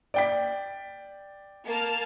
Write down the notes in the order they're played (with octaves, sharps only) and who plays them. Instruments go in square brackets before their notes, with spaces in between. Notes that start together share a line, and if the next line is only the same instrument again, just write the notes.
[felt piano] D5 G5 B6
[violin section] A#3 A5 F6